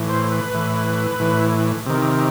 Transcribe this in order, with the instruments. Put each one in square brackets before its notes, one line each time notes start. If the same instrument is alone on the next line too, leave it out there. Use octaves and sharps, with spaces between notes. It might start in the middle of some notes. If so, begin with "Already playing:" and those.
Already playing: [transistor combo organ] A2 E3
C5
B4
A2 E3
A2 E3
C3 D#3